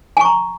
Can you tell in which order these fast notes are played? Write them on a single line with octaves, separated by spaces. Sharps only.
G#5 C#6 A#5